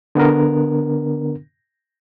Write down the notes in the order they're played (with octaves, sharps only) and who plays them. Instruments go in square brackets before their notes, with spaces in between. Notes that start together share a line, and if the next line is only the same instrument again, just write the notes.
[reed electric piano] D3 B3 D4 A#4